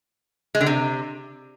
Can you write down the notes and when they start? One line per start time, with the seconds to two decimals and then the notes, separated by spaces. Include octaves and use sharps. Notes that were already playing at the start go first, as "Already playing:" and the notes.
0.55 G#3
0.61 D3
0.66 C3